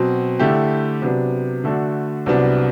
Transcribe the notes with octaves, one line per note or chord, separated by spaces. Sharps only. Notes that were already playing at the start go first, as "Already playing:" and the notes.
Already playing: B2 F#3 C4
D3 A3 E4 G4
C3 F#3 B3 D4
D3 A3 D4 F#4
C2 C3 F#3 B3 D4